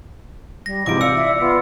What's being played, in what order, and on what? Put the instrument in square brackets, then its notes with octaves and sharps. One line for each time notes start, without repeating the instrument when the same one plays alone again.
[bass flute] G3 [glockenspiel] A#6
[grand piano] G#2 C3 E3 [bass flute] F4 [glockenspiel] D6 D7
[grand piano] F4 F5 [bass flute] D5 [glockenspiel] E6 C#7
[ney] E5
[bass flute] B3 [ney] F4